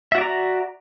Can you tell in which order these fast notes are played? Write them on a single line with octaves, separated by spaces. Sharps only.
E5 F#4 D5 A#5